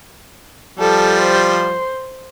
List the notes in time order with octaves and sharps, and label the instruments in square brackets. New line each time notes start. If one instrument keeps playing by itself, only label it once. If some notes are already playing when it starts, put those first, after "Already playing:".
[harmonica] F3 G3 [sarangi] A4
[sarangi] C5